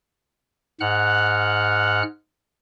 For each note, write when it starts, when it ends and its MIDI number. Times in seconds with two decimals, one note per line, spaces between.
0.80 2.03 44
0.80 2.03 78
0.80 2.03 89
0.80 2.03 90